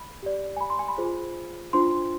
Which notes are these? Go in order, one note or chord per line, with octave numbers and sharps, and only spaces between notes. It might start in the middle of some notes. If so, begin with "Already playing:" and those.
Already playing: B5
G4 D5
G#5
B5
C6
G#5
B5
F4 G#4 C5
D4 F4 C5 C6